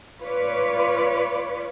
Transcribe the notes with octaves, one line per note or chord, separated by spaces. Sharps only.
F4 B4 C#5 D5